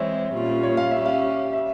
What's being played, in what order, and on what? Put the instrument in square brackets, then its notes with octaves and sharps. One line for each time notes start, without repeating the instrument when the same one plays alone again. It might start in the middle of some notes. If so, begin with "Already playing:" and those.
Already playing: [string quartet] E3 G#3 C4 [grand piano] C#5 E5
[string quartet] A#2 G3 C#4 F4
[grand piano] C#5
F5
[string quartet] G3 C#4 G4 [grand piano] E5
[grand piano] F5
E5